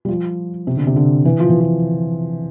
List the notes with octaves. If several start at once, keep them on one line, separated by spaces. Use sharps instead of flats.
G3
F3
C3
D3
C3
D3
E3
F3
E3
F3